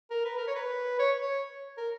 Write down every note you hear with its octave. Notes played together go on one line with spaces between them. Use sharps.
A#4
B4
A#4
C#5
B4
C#5
C#5
A#4